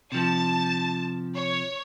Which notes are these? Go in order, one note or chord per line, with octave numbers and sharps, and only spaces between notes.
C3 F3 A5
C#5